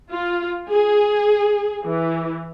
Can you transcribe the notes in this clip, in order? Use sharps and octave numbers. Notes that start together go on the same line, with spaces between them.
F4
G#4
E3